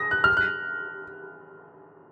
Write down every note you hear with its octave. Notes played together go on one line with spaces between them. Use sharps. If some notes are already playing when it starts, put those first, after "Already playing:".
Already playing: D#6 A#6
F#6
F6
F#6